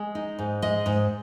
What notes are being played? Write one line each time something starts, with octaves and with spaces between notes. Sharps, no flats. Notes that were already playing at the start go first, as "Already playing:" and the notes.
Already playing: G#3
D#4
G#2
G#3 D#5
G#2